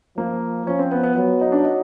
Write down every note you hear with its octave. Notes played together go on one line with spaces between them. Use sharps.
F3 A#3
F3 C#4
C4
B3
B3
F#3 B3
D#4
D4
D#4